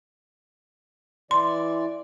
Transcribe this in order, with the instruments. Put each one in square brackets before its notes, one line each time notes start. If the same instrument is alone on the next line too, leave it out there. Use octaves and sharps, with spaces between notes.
[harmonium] E3 D5 [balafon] C6